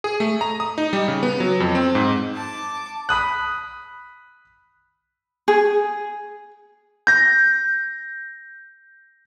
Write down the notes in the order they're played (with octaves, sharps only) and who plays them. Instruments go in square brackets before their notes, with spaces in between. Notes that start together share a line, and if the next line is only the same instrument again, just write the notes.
[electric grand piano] G#4
A3
A#5
D#6
D#4
G3
C#3
B3
F#3
F2
C4
G#2
[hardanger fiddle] A5 D6
[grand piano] B5 D#6 F#6
[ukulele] G#4
[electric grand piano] G6 A#6